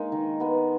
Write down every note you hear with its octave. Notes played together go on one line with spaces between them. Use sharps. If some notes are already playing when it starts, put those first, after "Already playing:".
Already playing: G#3 A#3 D#4
D#3
G#3 B3